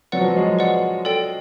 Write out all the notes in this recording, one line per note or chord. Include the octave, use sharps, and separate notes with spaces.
F#3 B4 D5 F#5
F3
F#3
G#3
B4 D5 F#5
A4 D5 G5